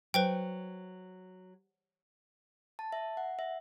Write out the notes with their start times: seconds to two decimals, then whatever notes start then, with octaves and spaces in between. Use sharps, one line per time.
0.14 F#3 B4 C5 G5
2.79 A5
2.93 E5
3.17 F#5
3.39 E5